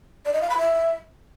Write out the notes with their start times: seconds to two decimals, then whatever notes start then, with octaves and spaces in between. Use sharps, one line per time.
0.25 D5
0.33 D#5
0.41 F5
0.49 B5
0.57 E5